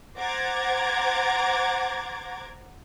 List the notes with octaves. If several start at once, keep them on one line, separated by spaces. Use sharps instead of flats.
C5 F#5 A#5 D6 G#6 A6